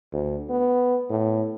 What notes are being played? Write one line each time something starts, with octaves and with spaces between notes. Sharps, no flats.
D2
B3
A2